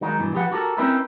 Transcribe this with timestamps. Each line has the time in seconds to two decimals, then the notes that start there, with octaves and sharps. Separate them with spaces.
0.01 D#3 F#3 G#3 D#4
0.20 G2 B2 E3
0.34 F3 G4 G#4 B4 F#5
0.52 F#4 G4 A4 A#4
0.77 C4 C#4 D#4 E4 A#4 B4